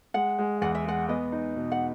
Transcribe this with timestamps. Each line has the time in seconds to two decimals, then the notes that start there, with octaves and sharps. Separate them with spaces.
0.14 G#3 F#5
0.39 G#3
0.62 E2 F#5
0.75 E5
0.86 G#3 F#5
1.09 B3 D#5
1.32 D#4
1.56 B2
1.72 F#5